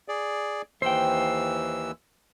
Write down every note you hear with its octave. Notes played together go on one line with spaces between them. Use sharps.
G#4 D5
D#2 E3 C5 G5 E6